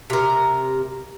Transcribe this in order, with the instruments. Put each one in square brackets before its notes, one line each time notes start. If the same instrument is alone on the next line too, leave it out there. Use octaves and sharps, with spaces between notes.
[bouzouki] C3 A#4